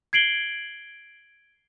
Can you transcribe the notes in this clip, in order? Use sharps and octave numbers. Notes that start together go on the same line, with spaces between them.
G#6 C7 D7 F#7 G7